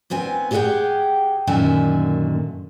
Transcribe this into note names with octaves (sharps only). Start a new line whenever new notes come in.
D#2 B3 C4 G#5
G4 G#4 D#5 E5 F#5 G5
F#2 A#2 D3 D#3 E5 G#5